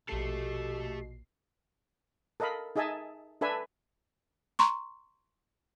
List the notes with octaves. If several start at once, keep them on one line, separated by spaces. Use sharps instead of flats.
A#1 B2 A3 G4 A4 C7
A4 A#4 D#5 F5 B5
D#4 G#4 D#5 E5 G#5 A5
D4 A4 B4 E5 G#5
A#5 C6 C#6